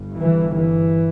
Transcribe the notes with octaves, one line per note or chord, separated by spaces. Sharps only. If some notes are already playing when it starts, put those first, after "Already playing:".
Already playing: G1 G2
E3
E3